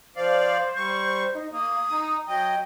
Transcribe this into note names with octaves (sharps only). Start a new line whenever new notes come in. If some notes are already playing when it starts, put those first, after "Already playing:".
F3 C5 D5 F5
G3 C#6
D#4
A#3 D#6
D#4
F#3 D#5 G5